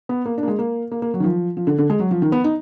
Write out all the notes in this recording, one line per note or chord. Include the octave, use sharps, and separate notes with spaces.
B3
A#3
D4
A#3
G#3
A#3
A#3
A#3
F#3
D#3
F3
F3
D3
D3
G#3
F#3
F3
D#3
B3
D#4